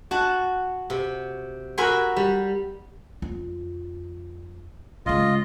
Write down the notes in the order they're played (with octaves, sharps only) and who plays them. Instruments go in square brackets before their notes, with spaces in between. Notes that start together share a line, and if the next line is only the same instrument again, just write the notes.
[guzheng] F#4 A5
C3
F#4 A#4 E5 G#5 B5 C6
G3
[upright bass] F2 F4
[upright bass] C#3 G#3 [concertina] F4 D#5